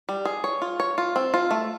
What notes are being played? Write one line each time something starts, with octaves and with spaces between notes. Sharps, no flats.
G3
G#4
C#5
F4
C#5
F4
C4
F4
A3